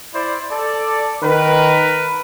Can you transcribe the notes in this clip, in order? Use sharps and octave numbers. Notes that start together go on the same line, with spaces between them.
E4 C5 D5
A4 D5
D#3 A#4 B4